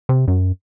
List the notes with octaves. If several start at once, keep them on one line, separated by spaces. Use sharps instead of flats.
C3
F#2